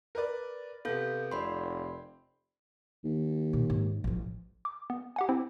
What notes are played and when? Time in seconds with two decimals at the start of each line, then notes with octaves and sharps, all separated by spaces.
0.15 A#4 B4 D5
0.85 C3 B3 A4 F5 G6
1.31 F1 C4 D5 B5 C6
3.04 D#2
3.53 A#2
3.70 G#2
4.04 A1 F3
4.65 D6
4.90 B3
5.16 G4 F#5 G#5
5.29 C4 E4 C5